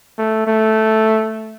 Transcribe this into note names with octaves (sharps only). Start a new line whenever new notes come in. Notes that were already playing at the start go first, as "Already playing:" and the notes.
A3
A3